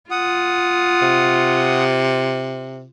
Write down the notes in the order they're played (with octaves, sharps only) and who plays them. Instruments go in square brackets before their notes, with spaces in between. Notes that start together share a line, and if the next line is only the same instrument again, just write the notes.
[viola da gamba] F4 [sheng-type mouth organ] F#5 D#6
[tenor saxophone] C3